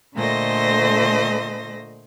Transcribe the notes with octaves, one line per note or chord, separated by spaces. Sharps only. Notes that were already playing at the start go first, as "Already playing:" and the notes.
A#2 D3 A3 C5 D#5 A#6